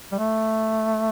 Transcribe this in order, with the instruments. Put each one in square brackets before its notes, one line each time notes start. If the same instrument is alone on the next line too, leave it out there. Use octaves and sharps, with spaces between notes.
[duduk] G3
A3